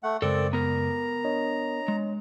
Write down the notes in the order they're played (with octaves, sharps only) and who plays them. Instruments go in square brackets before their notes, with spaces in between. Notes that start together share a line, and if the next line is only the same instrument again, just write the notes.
[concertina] A3 F#5
[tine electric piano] F#2 C#3 G#3 [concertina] C4 D5 [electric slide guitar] A4 A#4
[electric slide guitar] B3 A#4 [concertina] A#5
[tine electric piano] D4 C#5 D#5
[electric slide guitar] G#3